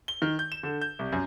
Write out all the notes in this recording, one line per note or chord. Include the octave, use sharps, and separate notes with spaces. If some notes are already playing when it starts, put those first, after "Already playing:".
G7
D#3
G6
E7
D3
G6
C2
F#2